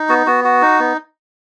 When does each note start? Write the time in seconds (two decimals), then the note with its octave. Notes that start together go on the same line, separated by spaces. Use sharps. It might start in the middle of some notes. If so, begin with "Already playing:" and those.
Already playing: D#4
0.09 B3 F#4
0.27 B3 F#4
0.44 F#4
0.62 D#4
0.80 B3